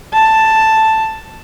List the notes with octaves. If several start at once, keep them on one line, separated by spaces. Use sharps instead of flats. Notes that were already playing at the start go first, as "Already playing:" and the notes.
A5